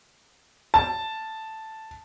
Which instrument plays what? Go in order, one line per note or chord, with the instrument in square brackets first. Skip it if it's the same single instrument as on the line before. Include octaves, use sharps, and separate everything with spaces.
[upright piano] A5